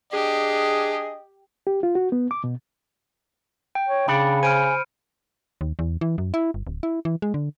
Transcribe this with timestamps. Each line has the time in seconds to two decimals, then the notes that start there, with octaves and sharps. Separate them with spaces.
0.13 D4 G4 G#4 D#5
1.67 G4
1.83 F4
1.95 F#4
2.12 B3
2.31 D6
2.44 B2
3.75 G5
3.88 C#5
4.08 C#3 D4 B5 C#7
4.43 C5 G#5 F6 D7 D#7
5.61 D#2
5.79 E2
6.01 E3
6.18 F#2
6.34 E4
6.54 G1
6.67 D1
6.83 E4
7.05 E3
7.22 G#3
7.34 D3